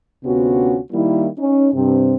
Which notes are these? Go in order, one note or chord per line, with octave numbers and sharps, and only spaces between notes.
D2 C3 B3 C#4 F4 F#4
D#3 G3 A#3 E4
C#4 D#4
G2 C3 C4